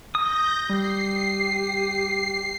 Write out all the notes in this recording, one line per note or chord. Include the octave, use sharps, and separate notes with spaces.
D#6 G6 A#6
G3 G4 C7